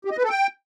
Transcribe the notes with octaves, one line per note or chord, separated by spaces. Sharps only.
G4
D#5
B4
A4
G5